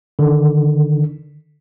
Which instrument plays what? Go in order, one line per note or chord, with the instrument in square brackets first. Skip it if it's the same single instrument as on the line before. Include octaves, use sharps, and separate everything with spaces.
[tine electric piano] D3 D#3